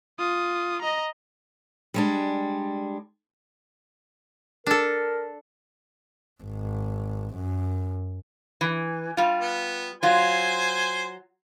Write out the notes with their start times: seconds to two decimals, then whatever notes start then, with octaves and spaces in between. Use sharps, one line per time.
0.19 F4 D#6
0.82 D#5 A#5
1.94 G3 G#3 D4
4.67 D4 A4 A#4
6.43 G#1
7.35 F#2
8.61 E3
9.17 G3 F4
9.41 B3
10.03 F#3 F4 C5 G#5 C6